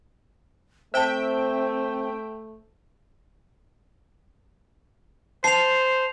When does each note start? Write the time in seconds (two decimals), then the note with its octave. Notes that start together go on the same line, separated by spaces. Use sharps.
0.94 A3 C4 C5 E5 G5 A5
5.44 C5 A5 C7 F7